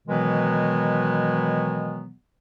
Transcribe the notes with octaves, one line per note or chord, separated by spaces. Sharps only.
B2 D#3 E3 F#3 G#3 B3